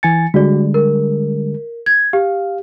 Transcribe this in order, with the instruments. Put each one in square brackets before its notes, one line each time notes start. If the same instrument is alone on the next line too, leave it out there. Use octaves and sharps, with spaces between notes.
[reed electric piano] E3 G#5 A6 [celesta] C#7
[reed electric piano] D3 G3 G#3 [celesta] F#4 D5
[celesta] A#4
G#6
[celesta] G4 [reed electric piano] F5